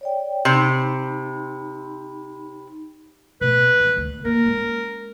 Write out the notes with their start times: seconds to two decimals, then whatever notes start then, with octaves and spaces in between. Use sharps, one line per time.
0.01 C#5 D5 G5
0.45 C3 D#4 B5
3.41 B2 A3 B4
3.80 F3 D4
3.96 D2 D#3
4.25 A#3 A#4
4.45 G#3 C#4